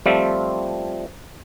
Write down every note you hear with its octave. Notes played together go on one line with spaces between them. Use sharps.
F3 G3 A3 C4 F4